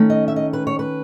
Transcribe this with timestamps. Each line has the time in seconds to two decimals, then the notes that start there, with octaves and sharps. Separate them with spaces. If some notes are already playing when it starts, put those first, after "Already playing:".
Already playing: D#3 A3 C#4
0.10 D#5
0.28 E5
0.36 D#5
0.53 B4
0.67 C#5
0.79 B4